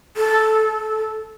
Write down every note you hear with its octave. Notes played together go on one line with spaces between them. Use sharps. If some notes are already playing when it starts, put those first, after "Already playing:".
A4